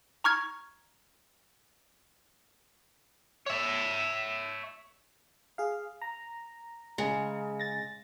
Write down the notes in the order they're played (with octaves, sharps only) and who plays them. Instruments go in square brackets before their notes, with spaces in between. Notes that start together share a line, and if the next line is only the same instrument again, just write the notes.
[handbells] A#5 C#6 F6 G#6
[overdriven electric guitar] C#5 E5
[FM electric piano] G#4 F5
A#5
[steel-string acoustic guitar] C#3 [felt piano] G#3
[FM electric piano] A6 A#6